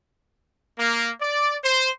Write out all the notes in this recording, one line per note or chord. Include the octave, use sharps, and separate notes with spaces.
A#3
D5
C5